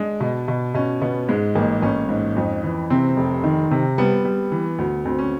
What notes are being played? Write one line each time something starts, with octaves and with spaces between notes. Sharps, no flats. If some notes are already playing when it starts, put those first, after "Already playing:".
Already playing: G#3 D4
B2
B2
B2 C#4
B2 B3
G#2 G#3
A1 A#3
A1 C#4
G#2
F2
E3
C3 C4
F1
D#3
C3
G3 B3
G3
E3
D2
D2 C4
C#4